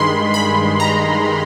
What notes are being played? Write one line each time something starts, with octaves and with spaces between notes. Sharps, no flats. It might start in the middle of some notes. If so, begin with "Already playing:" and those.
Already playing: G2 D#3 G#3 B5 C6
B5
A#5